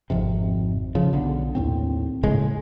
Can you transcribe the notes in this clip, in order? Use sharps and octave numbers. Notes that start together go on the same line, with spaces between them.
G#1 F2 C3
C#3 F3
B1 D3
D#2 A2 C4
A#1 A2 C#3 G#3